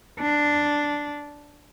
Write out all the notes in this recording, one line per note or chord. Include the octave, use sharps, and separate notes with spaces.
D4